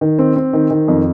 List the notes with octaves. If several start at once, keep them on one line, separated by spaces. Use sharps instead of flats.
D#3
C4
C4
D#3
D#3
F2